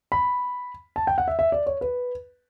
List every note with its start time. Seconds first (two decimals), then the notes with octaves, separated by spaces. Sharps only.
0.12 B5
0.96 A5
1.07 G5
1.18 F#5
1.28 E5
1.39 E5
1.52 D5
1.66 C#5
1.81 B4